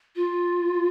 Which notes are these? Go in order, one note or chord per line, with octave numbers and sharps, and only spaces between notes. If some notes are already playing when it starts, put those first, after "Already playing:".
F4